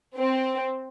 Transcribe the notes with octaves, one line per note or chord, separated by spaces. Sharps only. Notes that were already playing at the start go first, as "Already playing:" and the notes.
C4